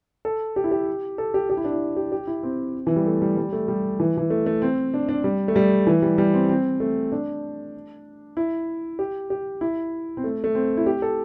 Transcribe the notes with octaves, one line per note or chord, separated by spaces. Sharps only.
A4
G4
E4
G4
A4
G4
G4
E4
D4
E4
G4
G4
E4
C4
E3
G3
A3
G3
G3
A3
G3
E3
E3
A3
A3
C4
D4
D4
G3
A3
G3
E3
G3
G3
C4
C4
A3
D4
E4
G4
G4
E4
C4
A3
A3
C4
E4
G4
A4